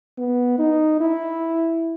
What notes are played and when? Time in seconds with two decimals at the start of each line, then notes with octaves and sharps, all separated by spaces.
0.18 B3
0.59 D#4
1.00 E4